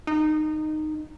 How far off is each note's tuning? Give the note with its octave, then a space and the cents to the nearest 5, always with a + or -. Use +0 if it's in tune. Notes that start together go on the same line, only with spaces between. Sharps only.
D#4 -15